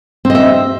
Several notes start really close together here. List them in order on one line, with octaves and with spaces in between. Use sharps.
C4 D#5 E5